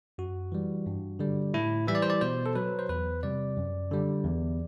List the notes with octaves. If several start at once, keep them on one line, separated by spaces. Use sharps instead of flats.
F#2 F#4
E3 G3
G2
D3 G3
A2 E4
E3 G3 E5
D5
C5
D5
B2 C5
A4
F#3 B4
C5
E2 B4
C3 G3 D5
F#2
D3 G3
E2